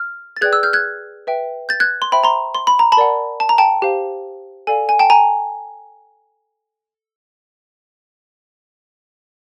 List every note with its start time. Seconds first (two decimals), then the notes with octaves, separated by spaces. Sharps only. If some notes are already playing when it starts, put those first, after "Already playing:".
Already playing: F6
0.37 A6
0.41 G#4 B4 D5 G5 F#6 G#6
0.52 E6 F#6
0.63 F6 G6
0.73 F#6 G#6
1.27 B4 E5 G5
1.69 G6 A6
1.80 F#6 G#6
2.02 C6
2.12 C5 E5 G5 B5
2.24 A#5 C6
2.55 C6
2.67 B5
2.79 A#5
2.92 A5 B5
2.97 A#4 D5 F#5
3.40 A5
3.49 A#5
3.58 G5 A5
3.82 G4 C5 F5
4.67 A4 D5 F5 G#5
4.89 G#5
4.99 G5 A5
5.10 G#5 A#5